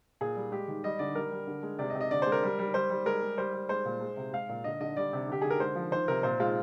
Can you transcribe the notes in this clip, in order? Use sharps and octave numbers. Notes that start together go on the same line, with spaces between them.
A#2 G#4
G3
G#3 G4
D#3
G3 D#5
D3 D5
G3 A#4
G3
D3
G#3
C3 D5
D#5
C3
D#5
D3 D5
G#3 C5
A#4
G3
G3
G3 C5
G3
G#3 A#4
G#3
G3 C5
G3
G#3 C5
A#2
G#3
C3
G#3 F5
A#2
D3 D#5
D3 D#5
G3 D5
C3
D3 G4
D3 G#4
A#4
G#3 C5
F3
D#3 C5
C3 A#4
A#2 C5
G#3 F4